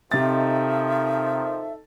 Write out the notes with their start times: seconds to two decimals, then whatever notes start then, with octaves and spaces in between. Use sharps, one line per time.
0.11 C3 D#3 F3 D#4 A4 E5 A6